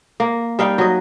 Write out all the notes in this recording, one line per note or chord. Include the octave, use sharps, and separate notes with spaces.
A#3
G3 D#4 F5 G5
F#3 D#5